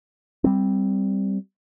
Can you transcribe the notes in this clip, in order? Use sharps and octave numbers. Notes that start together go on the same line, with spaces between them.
G3 C4